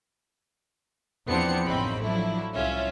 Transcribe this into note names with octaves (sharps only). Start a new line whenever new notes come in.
E2 F3 B3 C4 D4 C#7
A1 F#2 C#3 C4 D#4 B5
F3 F#3 A3 D4 E4
C2 C#4 F4 E5